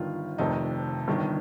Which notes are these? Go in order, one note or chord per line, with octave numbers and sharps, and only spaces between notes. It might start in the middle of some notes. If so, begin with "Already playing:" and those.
Already playing: G1 G2 D#3 F4
F1 F2 C3 D#3 D#4
G1 G2 D#3